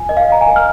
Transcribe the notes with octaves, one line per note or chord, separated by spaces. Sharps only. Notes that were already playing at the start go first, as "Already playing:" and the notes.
Already playing: F4 G#5
A#4 D#5
F5
D5 A#5
G#5
A#4
F6